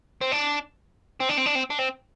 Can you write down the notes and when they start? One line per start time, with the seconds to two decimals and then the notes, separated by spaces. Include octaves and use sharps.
0.21 C4
0.32 D4
1.20 C4
1.29 D4
1.37 C4
1.46 D4
1.55 C4
1.70 D4
1.79 C4